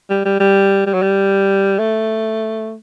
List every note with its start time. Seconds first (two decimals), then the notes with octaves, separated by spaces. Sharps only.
0.10 G3
0.25 G3
0.40 G3
0.87 G3
0.94 F#3
1.02 G3
1.79 A3